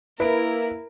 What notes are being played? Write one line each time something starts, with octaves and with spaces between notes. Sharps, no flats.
A#3 E4 A#4 B4 D7